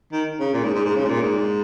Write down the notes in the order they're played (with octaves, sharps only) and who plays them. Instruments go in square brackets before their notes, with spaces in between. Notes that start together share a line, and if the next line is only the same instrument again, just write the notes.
[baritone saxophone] D#3
C#3
A#2
G#2
G#2
G#2
C#3
G#2
A#2
G#2